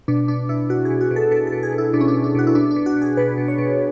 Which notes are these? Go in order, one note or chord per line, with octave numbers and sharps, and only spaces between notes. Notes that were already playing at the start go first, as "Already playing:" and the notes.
B2 D4
B2 D4
B2 E4
B2 F#4
G#4
B2
F#4
B2
A4
B2 A4
A4
B2
G#4
B2
E4
B2 D4
C#4
D4
B2
D4
B2 F#4
E4
B2 D4
D4
B2
F#4
B2
G#4
B2 B4
B2
C#5
B2